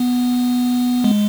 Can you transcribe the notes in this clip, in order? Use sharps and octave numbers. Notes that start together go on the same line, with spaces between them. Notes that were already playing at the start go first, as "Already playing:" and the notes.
Already playing: B3
G#3